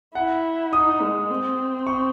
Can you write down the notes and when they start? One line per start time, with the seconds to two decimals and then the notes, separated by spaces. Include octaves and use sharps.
0.15 E4 F#5
0.72 D#4 D#6
1.02 G#3
1.30 C4
1.87 C#6